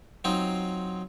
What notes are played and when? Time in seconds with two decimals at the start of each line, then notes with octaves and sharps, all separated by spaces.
0.24 F#3 C4 D#4 F4